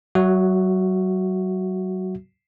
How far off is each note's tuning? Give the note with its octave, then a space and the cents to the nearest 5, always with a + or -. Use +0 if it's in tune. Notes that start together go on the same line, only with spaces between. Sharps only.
F#3 +35 F#4 +0 E5 +0